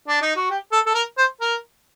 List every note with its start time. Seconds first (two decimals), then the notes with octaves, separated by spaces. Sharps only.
0.08 D4
0.22 D#4
0.36 F#4
0.50 G4
0.72 A4
0.87 A4
0.95 A#4
1.18 C5
1.41 A#4